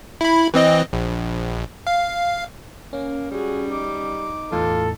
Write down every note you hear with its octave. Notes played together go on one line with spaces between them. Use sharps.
E4 B5
E3 C4 D#5
A#1
F5
A#3 C#4
G3 F#4 G#4
D#4 D6
E2 A2 E3 F4 A4